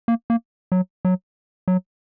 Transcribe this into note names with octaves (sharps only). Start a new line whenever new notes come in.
A#3
A#3
F#3
F#3
F#3